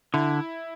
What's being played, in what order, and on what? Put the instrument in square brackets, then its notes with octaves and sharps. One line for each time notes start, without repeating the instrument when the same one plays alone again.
[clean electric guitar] D3 [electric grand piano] E4